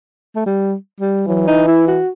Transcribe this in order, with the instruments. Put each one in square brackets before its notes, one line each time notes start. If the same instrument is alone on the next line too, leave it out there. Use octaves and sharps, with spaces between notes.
[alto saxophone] A3
G3
G3
[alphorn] E3 [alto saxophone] F#3
[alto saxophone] D#4
E4
F#4